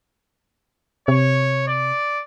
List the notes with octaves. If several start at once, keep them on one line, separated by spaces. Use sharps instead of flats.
C3 C#5
D5